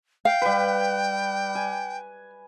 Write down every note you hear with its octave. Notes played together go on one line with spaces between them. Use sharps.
F5 G5
G3 B4
G#5